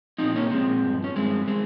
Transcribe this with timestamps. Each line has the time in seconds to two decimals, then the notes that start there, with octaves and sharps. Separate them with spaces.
0.18 A#2 F3 C4 D#4
0.36 A#3 C#4
0.51 A#2 F3 G#3 C4
0.83 G2 F3
1.04 C#4
1.16 G2 F3 G#3 C4
1.48 G#3 C4